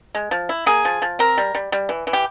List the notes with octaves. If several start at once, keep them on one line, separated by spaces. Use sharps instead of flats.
G#3
F3
E4
A#3 G#4
F3
F3
C4 A#4
G3
G3
G3
E3
E3
G4